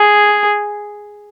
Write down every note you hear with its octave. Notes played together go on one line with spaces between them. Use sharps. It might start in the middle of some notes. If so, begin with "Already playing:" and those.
Already playing: G#4